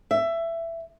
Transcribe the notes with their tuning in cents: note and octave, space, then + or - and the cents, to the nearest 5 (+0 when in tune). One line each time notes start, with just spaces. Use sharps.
E5 +15